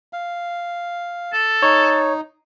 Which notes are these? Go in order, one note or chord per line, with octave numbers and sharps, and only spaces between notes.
F5
A4
D#4 C#5